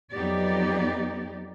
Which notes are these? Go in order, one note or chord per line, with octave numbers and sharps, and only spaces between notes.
F2 F#3 B3 D#4 G4 D5